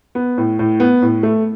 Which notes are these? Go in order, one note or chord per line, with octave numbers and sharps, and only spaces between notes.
B3
A2
A2
B3
A2
A3